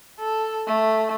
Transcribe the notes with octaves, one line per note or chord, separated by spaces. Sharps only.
A4
A3